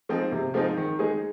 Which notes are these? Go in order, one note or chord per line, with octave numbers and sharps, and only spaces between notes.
F3 G#3 C4 D#4
C3
F3 G#3 C4 D#4
D#3
G#3 D#4 G#4